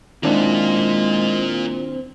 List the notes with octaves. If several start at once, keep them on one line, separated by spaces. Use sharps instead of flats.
D#3 G#3 A#3 C4 D4 E4 F4